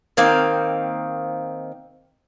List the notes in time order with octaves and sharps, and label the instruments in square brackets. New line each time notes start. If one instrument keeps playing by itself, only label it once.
[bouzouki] D#3 A#3 C4 F5